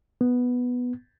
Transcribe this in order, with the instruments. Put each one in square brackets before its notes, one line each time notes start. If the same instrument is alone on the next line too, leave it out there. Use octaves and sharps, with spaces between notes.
[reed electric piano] B3